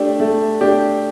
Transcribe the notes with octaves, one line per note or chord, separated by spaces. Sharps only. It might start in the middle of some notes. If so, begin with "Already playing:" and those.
Already playing: A3 D4 G4 D5
A3
D4 G4 D5